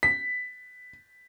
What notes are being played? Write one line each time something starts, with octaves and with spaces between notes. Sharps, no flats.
B6